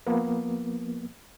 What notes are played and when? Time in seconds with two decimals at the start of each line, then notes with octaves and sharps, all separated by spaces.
0.07 F3 A#3 B3